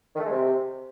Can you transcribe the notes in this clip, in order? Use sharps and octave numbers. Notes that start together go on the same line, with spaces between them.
D#3
A3
G#3
C3